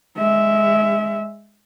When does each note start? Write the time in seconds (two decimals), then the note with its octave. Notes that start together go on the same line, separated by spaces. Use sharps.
0.17 G#3 E5